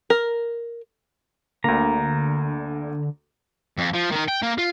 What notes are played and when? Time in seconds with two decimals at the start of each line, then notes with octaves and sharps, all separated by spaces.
0.10 A#4
1.64 D2 D3 A#3 A#5
3.78 F2
3.94 F3
4.11 D#3 D#4
4.28 G5
4.42 A#3
4.58 F4